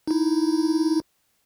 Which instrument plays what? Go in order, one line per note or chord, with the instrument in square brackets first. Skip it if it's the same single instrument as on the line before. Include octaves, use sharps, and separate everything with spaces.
[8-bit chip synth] D#4 E4